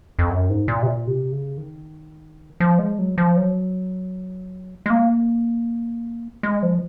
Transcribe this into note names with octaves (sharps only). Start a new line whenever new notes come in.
F2
F#2
G#2
A#2
C3
A#2
C3
C#3
D#3
F3
G#3
F#3
F3
F#3
G#3
A#3
G#3
F3